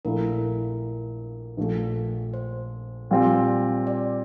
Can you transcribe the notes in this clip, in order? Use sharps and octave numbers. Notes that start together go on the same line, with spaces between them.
A#1 A#2 A3 E4 A#4
A#1 A#2 A3
C5
A#2 G3 C4 F4
D5